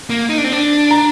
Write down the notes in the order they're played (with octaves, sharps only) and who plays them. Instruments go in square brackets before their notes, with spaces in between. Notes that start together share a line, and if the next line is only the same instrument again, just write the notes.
[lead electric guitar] A#3
D#4
D4
C4
D4
[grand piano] A#5